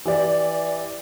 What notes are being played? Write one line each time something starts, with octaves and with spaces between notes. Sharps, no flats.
E3 G4 D5